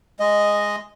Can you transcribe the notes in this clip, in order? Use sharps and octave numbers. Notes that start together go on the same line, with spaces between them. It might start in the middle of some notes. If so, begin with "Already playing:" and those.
G#3 D#5